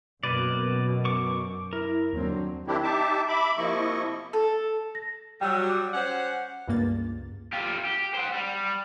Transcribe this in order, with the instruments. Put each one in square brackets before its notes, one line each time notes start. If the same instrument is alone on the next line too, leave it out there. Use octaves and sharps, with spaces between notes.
[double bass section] F#2 [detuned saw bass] B2 [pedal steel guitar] A#3 B4 D5
[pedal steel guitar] C#6 D6
[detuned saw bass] E4 [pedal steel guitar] A#4
[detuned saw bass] D#2 [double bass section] D3 F#3 C4
[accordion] D#3 C4 D4 E4 G4
D#4 G4 E5 A5 D6
E5 B5 D6
C3 F3 A#3 E4 D#5 C#6
[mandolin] A4
[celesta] A#6
[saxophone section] F#3 G3 [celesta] G5 E6
[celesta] D6
[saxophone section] C#4 C5 F#5
[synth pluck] C#2 G2 A#3 A6
[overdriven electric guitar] F4 G4
G4
C5 F#5
G3